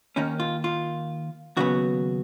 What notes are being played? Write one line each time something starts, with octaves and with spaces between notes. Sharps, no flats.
D#2 D#3 A#3 C#4
F4
F4
D#2 C#3 F#3 B3 F#4